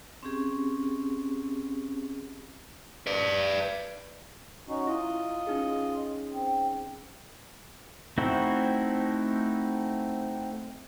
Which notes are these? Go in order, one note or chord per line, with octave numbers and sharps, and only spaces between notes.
C4 C#4 G4 G#4
B4 D5
C#4 D#4 F#4
E4 F4 D#5
C#4 D#4 G#4
C4
A3 C4 D#4 E4 F#4